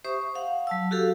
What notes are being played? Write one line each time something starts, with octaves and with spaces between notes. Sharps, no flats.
G4 C5 E5 C#6 D#6
F5 F#5
F#3 A5 E6
F#4 G4 A4 F5